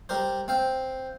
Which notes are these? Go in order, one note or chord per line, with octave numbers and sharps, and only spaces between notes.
G3 G4 A#4 C5
C4 F5 G5